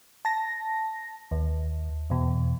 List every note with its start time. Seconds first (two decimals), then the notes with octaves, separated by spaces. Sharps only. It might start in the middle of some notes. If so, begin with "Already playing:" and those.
0.25 A5 A#6
1.31 D#2
2.10 E2 B2